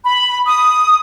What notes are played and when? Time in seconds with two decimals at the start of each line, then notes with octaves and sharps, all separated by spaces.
0.05 B5
0.47 D#6